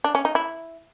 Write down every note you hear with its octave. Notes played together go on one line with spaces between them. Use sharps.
D4
C#4
D#4
E4